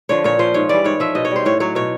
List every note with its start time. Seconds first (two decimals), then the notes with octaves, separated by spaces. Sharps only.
0.09 D3 F3 C#5
0.24 A#2 C#5
0.39 F3 C5
0.54 G#2 C#5
0.69 E3 G3 D5
0.84 G#2 C#5
1.00 F3 E5
1.15 B2 D#5
1.25 C#5
1.31 G3 C5
1.45 A2 C#5
1.60 F#3 C#5
1.75 B2 C#5